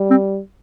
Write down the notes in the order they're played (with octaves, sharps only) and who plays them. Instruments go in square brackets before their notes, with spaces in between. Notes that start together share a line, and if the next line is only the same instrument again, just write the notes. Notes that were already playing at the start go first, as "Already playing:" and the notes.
Already playing: [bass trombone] G3
[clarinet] C4